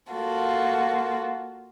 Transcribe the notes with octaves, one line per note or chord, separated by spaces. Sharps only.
A#3 F4 F#4 A4